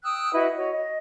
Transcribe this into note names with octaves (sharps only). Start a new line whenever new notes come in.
G5 D#6 E6 F#6
E4 F#4 B4 D#5
F#4 C#5 D#5
D#5